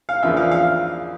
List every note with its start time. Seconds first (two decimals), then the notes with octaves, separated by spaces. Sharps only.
0.09 F5
0.23 E2 C#3 F3 A#3 D4 E5
0.37 F5
0.51 F5